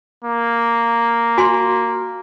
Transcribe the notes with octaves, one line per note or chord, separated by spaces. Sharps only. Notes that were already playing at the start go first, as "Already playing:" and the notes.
A#3
F#4 G#5 C6